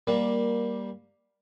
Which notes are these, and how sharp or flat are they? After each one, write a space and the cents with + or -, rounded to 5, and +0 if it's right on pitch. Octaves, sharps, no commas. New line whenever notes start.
G3 +0 A#3 +10